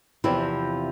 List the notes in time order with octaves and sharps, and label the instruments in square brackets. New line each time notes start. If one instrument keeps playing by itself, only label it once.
[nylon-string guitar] E2 C3 F3 C4 E4